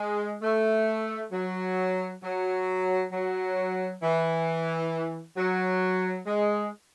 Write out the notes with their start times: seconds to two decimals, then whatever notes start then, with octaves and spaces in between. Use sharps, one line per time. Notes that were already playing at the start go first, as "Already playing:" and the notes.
Already playing: G#3
0.42 A3
1.32 F#3
2.23 F#3
3.12 F#3
4.03 E3
5.37 F#3
6.27 G#3